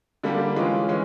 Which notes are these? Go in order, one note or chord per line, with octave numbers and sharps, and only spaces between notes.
D3 G3 A#3 D4 G4
E3 G#3 C#4 F4
E3 G#3 C#4